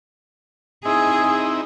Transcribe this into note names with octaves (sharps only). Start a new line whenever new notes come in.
C4 D#4 E4 G#4